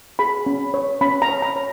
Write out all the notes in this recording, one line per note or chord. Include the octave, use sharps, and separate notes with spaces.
G#4 B5
C#4
C#5
C#4 B5
A#5
C#5
A#5
C#5